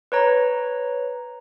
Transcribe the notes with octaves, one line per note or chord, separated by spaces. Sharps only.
B4 C#5 A#5